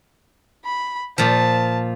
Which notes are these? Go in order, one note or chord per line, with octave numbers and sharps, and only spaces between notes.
B5
A#2 F3 A5